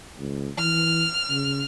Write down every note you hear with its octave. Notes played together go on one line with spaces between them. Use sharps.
C#2
E3 F6
C#3